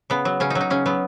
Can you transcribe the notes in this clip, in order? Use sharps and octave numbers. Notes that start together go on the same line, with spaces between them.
C#3 B3
F#3
C#3 C#4
D#4
F#3
D#4
C#3 C#4
F#3 B3